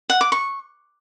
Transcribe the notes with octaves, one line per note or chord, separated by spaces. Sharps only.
F#5
D6
C#6